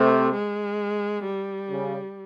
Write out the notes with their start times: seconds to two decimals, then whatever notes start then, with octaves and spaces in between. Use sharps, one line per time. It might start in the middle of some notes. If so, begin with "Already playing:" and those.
Already playing: C3 A3
0.34 G#3
1.25 G3
1.70 C#3